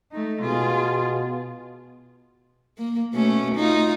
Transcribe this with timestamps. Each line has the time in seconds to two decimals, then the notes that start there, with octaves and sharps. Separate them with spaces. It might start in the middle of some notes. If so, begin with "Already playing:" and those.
0.12 A3 D#4
0.41 B2 F4 G#4
2.78 A#3
3.14 B2 A3 C#4
3.55 D#4 F4